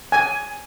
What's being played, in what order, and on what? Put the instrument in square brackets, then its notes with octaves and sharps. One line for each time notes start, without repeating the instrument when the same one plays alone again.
[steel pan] G#5